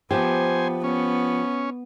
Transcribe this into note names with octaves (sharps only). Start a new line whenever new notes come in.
F3 B3 G4 C5 G#5
B3 C#4